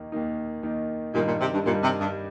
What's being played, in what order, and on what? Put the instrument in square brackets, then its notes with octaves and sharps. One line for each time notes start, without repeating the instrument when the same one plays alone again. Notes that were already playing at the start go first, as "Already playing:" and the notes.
Already playing: [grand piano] D#2 D#3 A#3 D#4
D#2 D#3 A#3 D#4
D#2 D#3 A#3 D#4
[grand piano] G2 D#3 G3 [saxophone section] A#2
[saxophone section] A#2
C3
G2
[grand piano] G2 D#3 G3 [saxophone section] A#2
[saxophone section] C3
G2